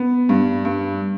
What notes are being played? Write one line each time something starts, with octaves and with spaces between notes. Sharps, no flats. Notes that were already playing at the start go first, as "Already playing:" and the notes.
Already playing: B3
G2
G2